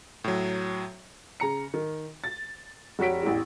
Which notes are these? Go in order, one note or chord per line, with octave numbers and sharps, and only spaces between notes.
A2 F#3
C#3 A#5 C#7
D#3
A6
F1 F#4 C#5 B6 D7
A1 E2